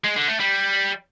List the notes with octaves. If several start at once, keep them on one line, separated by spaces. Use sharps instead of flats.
G#3
D3
A3
G3